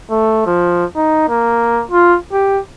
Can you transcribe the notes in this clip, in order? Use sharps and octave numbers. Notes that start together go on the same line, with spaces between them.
A3
F3
D#4
A#3
F4
G4